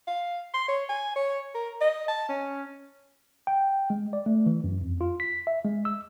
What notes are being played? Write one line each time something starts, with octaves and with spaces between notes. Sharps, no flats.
F5
C6
C#5
G#5
C#5
A#4
D#5
A5
C#4
G5
G#3
D5
A3
E3
F#2
F2
F4
B6
E5
G#3
E6